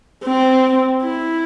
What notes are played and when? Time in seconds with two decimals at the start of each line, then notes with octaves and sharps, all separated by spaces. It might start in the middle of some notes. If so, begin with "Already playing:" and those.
0.25 C4
1.02 E4